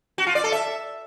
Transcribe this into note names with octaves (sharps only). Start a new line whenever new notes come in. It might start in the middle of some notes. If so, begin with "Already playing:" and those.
F#4
F4
D5
A4
E5